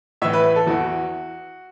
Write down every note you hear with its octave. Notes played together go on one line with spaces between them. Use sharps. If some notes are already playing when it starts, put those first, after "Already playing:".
A2 E3 E5
B4
B4
A4
E2 E3 F#4